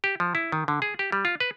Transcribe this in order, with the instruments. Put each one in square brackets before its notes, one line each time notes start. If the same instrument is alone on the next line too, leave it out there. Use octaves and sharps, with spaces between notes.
[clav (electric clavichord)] G4
F3
E4
D#3
D3
G#4
G4
G3
F4
B4